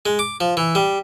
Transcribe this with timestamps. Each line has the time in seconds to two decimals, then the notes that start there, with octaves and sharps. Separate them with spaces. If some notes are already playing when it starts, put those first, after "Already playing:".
0.06 G#3
0.19 D6
0.40 F3
0.57 E3
0.75 G3